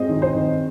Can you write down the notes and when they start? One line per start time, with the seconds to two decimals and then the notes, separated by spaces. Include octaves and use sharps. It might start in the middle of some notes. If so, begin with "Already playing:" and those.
Already playing: G#3 C4 D#5
0.09 D#3
0.22 C5
0.34 D#3